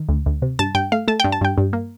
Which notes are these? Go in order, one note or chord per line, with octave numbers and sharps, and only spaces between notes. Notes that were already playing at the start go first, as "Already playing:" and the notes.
Already playing: D#3
D2
D2
C3
G2 A5
G2 G5
A3 F5
A3 A5
G5
G2
A5
G2 G5
G2
A#3